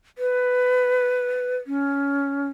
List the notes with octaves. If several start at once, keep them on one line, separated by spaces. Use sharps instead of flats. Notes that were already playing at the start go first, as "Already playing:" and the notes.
B4
C#4